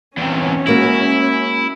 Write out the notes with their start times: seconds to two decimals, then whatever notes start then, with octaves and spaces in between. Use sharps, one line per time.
0.17 E2 C3 C#4
0.67 G#3 A#3 E4 F#4